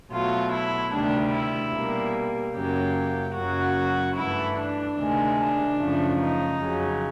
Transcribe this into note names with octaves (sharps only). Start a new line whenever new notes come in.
B2 F#3 A3 F4
E4
D2 C3 D#3 G3 D4
E4
B2 G3 A#3
F#2 C#3 F#3 A#3 G4
F#2 C#3 F#3 A#3 F#4
G2 E3 A3 E4
D4
D2 C3 D#3 G#3
D4
F#2 C#3 F3 A3
D#4
F2 C#3 F#3